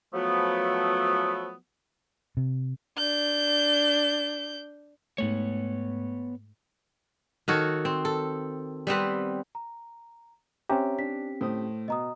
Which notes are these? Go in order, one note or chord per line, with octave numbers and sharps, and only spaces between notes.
F3 F#3 A3 B3
C3
D4 G6
G#2 A3 B3 C#5
D#3 F#4 A4 C#5
C4
A4
G3 B3 C4 B4
A#5
C4 C#4 G4 C#5 E5 A#5
D4 B6
A2 C5 D#6
B2 D#5 A#5 D#6